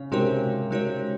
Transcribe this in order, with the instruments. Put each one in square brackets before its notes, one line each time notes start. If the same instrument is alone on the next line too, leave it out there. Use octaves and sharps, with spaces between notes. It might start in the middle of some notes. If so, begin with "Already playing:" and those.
Already playing: [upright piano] C#3 [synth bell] C#5
[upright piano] C3 [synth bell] G#3 D#4 F#4 A#4 C#5
[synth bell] G#3 D#4 F#4 A#4 C#5